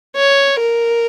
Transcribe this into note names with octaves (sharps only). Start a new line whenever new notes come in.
C#5
A#4